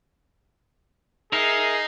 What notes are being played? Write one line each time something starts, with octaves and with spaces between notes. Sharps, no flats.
D#4 G#4 A#4 E5 C7